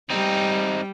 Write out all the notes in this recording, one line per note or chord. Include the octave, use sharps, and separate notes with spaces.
G3 C4 D#4